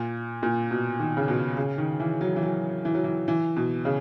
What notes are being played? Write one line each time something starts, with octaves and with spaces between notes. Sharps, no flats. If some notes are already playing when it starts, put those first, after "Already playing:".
Already playing: A#2
A#2
B2
D#3
C#3
B2
C#3
D#3
E3
F#3
E3
F#3
E3
F#3
E3
E3
B2
C#3